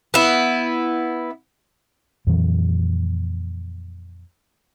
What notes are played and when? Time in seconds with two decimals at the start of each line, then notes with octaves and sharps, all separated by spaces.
0.14 B3 E4
2.27 F2 A#2 E3 F#3